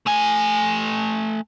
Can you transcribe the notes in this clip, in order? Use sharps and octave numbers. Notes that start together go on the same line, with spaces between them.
A3 G#5